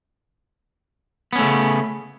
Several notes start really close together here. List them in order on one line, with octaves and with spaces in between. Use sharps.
B3 C#4 A3 C#3